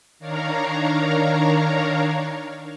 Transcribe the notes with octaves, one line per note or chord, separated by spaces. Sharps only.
D#3 D4 A#4 C#5 F5 A#5